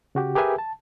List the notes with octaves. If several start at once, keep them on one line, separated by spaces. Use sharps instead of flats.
C#3 F#4 G4
G4 G#4 A#4 B4 E5 G#5
A5